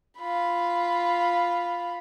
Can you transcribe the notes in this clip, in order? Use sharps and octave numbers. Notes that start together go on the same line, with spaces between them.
F4 B5